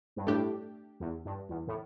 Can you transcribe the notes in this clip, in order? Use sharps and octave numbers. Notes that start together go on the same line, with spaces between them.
G2
A2 A3 D4 G4
E2
G2
E2
A2